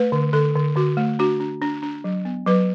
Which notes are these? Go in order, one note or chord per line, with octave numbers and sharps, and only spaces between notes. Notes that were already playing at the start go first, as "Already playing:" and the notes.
Already playing: A3 B4
D3
D3 A4
D3
D3 F#4
A3
D4 F#4
D4
D4
D4
F#3
B3
F#3 B4